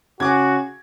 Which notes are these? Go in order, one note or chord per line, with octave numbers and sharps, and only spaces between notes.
C#3 F#4 G#4 D6 G#6